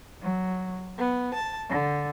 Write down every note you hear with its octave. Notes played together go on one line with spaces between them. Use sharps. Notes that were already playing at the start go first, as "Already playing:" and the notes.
F#3
B3
A5
D3